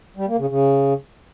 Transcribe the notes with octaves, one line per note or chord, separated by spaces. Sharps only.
G3
A#3
C#3
C#3